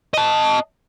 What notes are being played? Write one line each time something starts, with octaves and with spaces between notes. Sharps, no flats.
D#5 A5